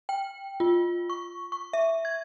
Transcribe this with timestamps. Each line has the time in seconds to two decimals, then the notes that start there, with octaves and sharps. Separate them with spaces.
0.09 G5
0.60 F4
1.10 C#6
1.52 C#6
1.73 E5
2.05 G#6